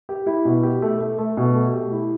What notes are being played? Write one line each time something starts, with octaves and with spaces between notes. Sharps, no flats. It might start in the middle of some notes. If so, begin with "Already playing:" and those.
G4
E4
B2
G4
A3
A3
A3
B2
A3
G4
E4